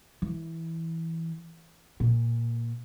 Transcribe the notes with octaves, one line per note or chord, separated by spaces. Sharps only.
E3
A#2